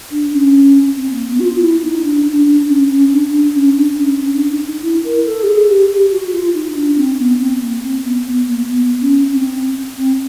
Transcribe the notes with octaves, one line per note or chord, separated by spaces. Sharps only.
D4
C#4
C4
A#3
B3
F#4
F4
E4
D#4
D4
D4
D4
C#4
C#4
D4
D4
C#4
D4
C#4
C#4
D4
D#4
D#4
E4
A#4
A4
G4
G#4
G4
G4
F#4
F4
D#4
D4
C4
B3
C4
A#3
C4
B3
B3
A#3
B3
C#4
C4
C4